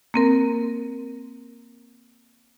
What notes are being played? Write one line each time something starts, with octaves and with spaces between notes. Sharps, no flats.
A#3 C4 A#4